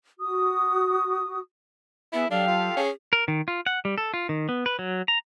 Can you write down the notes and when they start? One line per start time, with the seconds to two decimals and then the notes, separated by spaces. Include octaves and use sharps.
0.19 F#4 D#6
2.12 B3 E4 G#4 B4 E5
2.31 F#3 D4 G4 A4 F5
2.47 F4
2.77 C#4 G#4
3.13 A#4
3.28 D#3
3.48 F4
3.66 F#5
3.85 G3
3.98 A4
4.14 F4
4.29 D#3
4.49 B3
4.66 B4
4.79 F#3
5.08 A#5